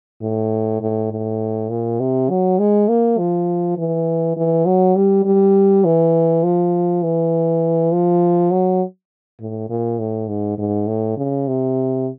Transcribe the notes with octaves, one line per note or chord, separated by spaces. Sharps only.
A2
A2
A2
A#2
C3
F#3
G#3
A#3
F3
E3
E3
F#3
G3
G3
E3
F3
E3
F3
F#3
A2
A#2
A2
G#2
G#2
A2
C#3
C3